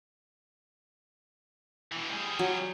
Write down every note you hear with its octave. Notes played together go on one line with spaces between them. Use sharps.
B2 E3
G3 G#4
F#3